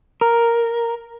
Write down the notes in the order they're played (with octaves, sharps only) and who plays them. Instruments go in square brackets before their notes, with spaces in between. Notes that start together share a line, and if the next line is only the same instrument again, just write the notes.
[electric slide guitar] A#4